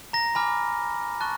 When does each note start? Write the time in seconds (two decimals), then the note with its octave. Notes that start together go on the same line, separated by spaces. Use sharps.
0.13 A#5 A#6
0.35 G#5 B5 D6 F6
1.20 A5 C#6 F#6 A6